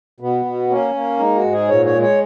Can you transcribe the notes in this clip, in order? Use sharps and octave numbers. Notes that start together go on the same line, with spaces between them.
B2 B3
B2
A#3 C#4
A#3
G#3 D#4
F#4
G#2
G#4
A#2 C#5
C#5
G#3
C#5